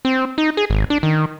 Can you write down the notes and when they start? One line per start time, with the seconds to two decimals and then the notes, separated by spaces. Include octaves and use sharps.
0.05 C4
0.38 D#4
0.57 G#4
0.70 G#1
0.90 D4
1.03 D#3